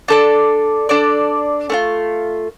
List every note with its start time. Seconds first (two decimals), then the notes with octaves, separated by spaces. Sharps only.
0.08 D4 A4 D5
0.89 D4 A4 D5
1.70 A3 D4 F4